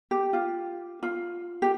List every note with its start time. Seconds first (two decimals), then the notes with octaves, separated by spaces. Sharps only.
0.11 G4
0.33 F4
1.03 F4
1.62 G4